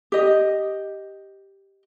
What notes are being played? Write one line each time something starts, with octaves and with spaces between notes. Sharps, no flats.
G4 D#5